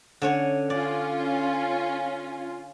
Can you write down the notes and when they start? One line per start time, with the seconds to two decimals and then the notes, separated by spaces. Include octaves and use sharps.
0.22 D3 C#4 C#5
0.70 C#4 F4 D5